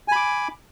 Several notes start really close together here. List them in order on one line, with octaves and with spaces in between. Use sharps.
G#5 B5 D6